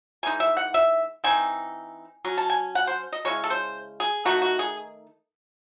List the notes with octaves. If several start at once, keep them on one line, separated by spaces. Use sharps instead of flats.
E3 G#3 D#4 G#5
E5
F#5
E5
E3 C4 D#4 G#5
F#3 C#4
A5
G#5
F#5
C5
D#5
C#3 G#3 C#4 E4 C#5
A4
C5
G#4
D#3 A3 D#4 F#4
F#4
G#4